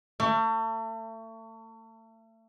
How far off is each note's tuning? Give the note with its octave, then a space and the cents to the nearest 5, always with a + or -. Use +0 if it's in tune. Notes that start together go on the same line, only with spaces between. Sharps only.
A3 +35